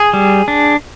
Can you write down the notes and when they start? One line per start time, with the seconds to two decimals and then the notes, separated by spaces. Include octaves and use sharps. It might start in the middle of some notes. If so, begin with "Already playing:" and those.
Already playing: G#4
0.13 G3
0.48 D4